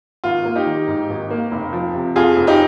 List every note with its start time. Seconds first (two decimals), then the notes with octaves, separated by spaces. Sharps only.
0.24 G#1 F4
0.45 A#3
0.56 D#4 G4
0.66 D#3
0.88 G#2
1.09 G#1
1.30 A#3
1.52 F1
1.73 F3
1.95 C3
2.16 F2 F4 G#4
2.37 F1
2.47 D#4 G4